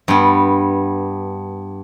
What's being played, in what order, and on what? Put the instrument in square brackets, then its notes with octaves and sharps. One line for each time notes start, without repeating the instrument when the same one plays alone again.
[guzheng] G2 B3